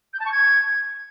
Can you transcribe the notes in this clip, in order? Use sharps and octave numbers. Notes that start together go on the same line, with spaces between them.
G6
A5
C#6
G#6